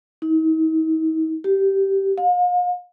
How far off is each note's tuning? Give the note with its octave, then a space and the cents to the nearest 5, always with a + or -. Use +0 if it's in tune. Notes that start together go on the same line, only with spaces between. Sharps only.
D#4 +45
G4 -10
F5 +40